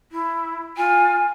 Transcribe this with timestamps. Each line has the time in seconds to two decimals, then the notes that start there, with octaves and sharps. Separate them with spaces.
0.11 E4
0.77 F4 G#5